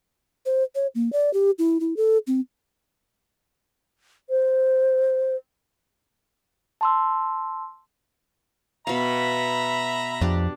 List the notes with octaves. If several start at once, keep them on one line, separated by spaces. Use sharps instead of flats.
C5
C#5
A#3
D5
G4
E4
E4
A4
C4
C5
A5 C6 E6
B2 E5 F5 A#5 B5
F2 D4 G4